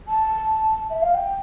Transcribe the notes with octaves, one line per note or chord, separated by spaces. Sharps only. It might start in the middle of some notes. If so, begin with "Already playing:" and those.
A5
E5
F5
G5